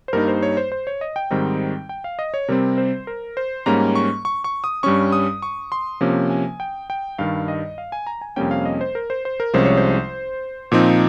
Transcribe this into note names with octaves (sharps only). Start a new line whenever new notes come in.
C5
G2 G3 A#3 D#4 A#4
C5
C#5
C5
C5
C#5
D#5
G5
G#2 D#3 G3 C4 D#4
G5
F5
D#5
C#5
C3 G3 C4 A#4
C5
A#4
C5
G#2 G3 A#3 C#4 A#5
C#6
C#6
C#6
D#6
G2 G3 C#4 C#6
D#6
C#6
C6
C3 F3 A#3 C#4
G#5
G5
G5
G2 D#3 G3 F5
D#5
F5
G#5
A#5
G#5
F2 C3 G3 A#3 C#4 G5
F5
D#5
C5
A#4
C5
C5
A#4
C2 C3 F3 G#3 C#4 C5
C#5
C5
A#2 F3 C4 D#4